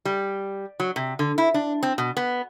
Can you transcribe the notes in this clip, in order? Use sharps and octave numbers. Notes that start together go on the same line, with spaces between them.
G3
F#3
C3
D3
E4
D4
C4
B2
B3